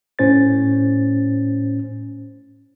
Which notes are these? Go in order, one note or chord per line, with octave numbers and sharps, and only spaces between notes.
A2 C#4 C5 A6